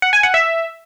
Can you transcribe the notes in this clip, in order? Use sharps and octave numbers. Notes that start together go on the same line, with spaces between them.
F#5
G#5
F#5
E5